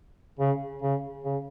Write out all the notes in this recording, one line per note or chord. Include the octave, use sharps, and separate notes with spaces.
C#3
C#3
C#3